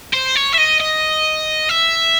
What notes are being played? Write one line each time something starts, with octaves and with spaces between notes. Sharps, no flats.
C5
C#5
E5
D#5
D#5
E5